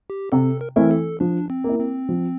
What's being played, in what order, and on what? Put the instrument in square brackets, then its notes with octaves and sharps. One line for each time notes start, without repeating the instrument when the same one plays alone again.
[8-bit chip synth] G4
[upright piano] C3 [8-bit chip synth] A4
[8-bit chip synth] A#4
[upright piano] E3 A3 C4 E4 [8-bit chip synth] A#4
[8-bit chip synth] A4
[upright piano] F3 [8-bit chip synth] D4
[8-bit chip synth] C4
[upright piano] A#3 E4
[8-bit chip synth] C4
[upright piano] F3